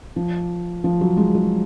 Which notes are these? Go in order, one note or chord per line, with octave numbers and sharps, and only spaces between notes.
F3
F3
F#3
G#3
F#3